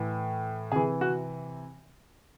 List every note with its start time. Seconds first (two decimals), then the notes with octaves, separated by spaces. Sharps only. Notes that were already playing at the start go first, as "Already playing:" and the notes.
Already playing: A2 E3
0.71 C3 G#4
0.76 E3
1.01 F#4